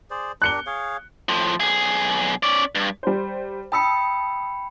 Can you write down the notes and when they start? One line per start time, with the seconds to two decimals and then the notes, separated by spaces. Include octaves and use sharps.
0.10 G#4 C5 D5
0.42 D4 G4 A#4 F#6 C#7 G7
0.67 G#4 C#5 F5
1.29 A2 F3
1.60 B1 G#4
2.43 C#4 D5
2.75 G2
3.03 G3 C5
3.72 G5 A5 B5 D#6 E6 C#7